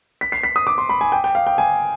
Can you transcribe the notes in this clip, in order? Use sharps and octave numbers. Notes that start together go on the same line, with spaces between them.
B6
C7
B6
D#6
D6
C6
B5
G#5
G5
G5
F5
G5
G#5